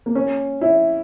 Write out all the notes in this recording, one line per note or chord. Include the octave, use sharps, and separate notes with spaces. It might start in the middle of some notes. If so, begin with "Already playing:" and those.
A#3
C#4
E4